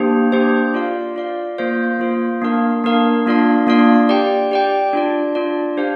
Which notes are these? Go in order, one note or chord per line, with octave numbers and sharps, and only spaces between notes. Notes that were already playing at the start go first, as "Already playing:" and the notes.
Already playing: A#3 D4 G4 C5
A#3 D4 G4 C5
F4 D5 F5
F4 D5 F5
A#3 F4 C5 F5
A#3 F4 C5 F5
A#3 D4 A#4 F5
A#3 D4 A#4 F5
A#3 D4 F4 D5 F5
A#3 D4 F4 D5 F5
G4 D5 G5
G4 D5 G5
D4 F4 D5
D4 F4 D5
D4 G4 C5 F5